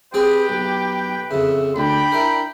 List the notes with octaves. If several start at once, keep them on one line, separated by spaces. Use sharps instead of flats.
C4 G4 G#4 B4 G5
B1
F2 C#3 E5
D2 D4 G5 B5
E4 A#4